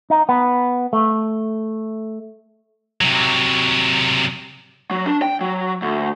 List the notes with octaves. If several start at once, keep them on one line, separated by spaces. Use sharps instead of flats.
D#4
B3
A3
C3 F#3
F#3
D4
G5
F#3
D2